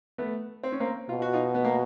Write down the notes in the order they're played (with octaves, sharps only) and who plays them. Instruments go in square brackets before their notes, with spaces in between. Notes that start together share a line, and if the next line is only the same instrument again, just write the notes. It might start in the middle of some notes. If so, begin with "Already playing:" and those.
[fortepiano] A3 B3
C4
C#4
A#3 C4
[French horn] B2 [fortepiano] F4
[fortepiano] F#4
D#4 F4
B3
A#3